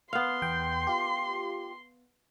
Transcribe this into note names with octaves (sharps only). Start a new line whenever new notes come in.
B3 F5 C6
E2 G5
F4 G4